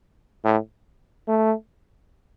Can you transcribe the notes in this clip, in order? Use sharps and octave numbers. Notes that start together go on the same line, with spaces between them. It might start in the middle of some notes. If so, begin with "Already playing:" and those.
A2
A3